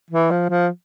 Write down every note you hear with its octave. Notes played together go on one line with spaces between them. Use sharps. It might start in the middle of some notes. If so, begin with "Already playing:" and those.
E3
F3
F3